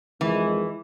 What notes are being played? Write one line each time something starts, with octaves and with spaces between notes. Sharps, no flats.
F2 D#3 E3 G#3